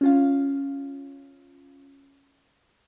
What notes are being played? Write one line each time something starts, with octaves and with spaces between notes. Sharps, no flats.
C#4 F4 F5